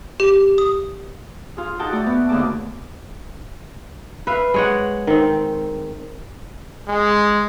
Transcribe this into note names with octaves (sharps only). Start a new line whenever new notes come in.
G4
D#6
F4 G#4
D#4 F#4 G#4 F#5 G5 A5
A3 F#4 D5
B3
D#2 D3 A#3 G#4 A5 D6
B4 E5 F5
G#3 C#5 F#5
D#3 C4
G#3